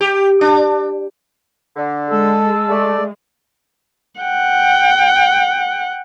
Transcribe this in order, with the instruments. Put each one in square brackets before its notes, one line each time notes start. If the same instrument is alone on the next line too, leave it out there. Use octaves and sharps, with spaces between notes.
[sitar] G4
D4
[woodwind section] D3
[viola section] G#3 [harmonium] A4 [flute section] A5 E6
[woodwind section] A3 [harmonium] D5
[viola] F#5 G5